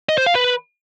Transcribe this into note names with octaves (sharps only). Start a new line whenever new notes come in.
D#5
C5
F5
B4